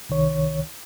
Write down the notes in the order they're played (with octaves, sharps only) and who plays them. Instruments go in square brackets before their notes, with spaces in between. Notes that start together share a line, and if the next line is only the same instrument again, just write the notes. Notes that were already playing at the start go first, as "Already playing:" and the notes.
[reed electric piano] C2 D#3 C#5